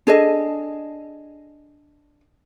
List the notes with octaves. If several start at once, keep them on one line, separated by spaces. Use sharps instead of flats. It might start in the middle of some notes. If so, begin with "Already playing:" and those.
D4 G#4 A4 D#5